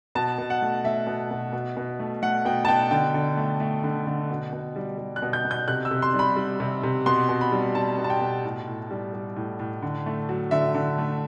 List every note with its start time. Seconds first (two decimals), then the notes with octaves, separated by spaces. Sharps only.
0.15 B2 A5
0.38 B2
0.50 F#5
0.62 A3
0.84 A3 E5
1.07 B2
1.31 B2
1.53 B2
1.77 B2
1.99 A3
2.22 A3 F#5
2.45 B2 G5
2.65 A5
2.68 B2 G5
2.91 D3 G5
3.14 D3
3.37 A3
3.60 A3
3.84 D3
4.07 D3
4.30 B2
4.53 B2
4.76 G3
4.98 G3
5.16 F#6
5.22 B2
5.33 G6
5.45 B2
5.51 G6
5.68 C3 F#6
5.85 E6
5.91 C3
6.02 C6
6.14 G3
6.19 B5
6.36 G3
6.60 C3
6.83 C3
7.06 B2 C6
7.29 B2
7.41 B5
7.52 G3
7.75 G3 A5
7.98 B2
8.04 A5
8.10 G5
8.21 B2
8.44 A2
8.67 A2
8.91 G3
9.14 G3
9.36 A2
9.59 A2
9.82 D3
10.06 A3
10.29 F#3
10.51 D3 E5
10.75 D3
10.98 A3